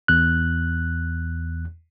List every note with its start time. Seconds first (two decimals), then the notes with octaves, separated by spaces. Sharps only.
0.08 E2 F#6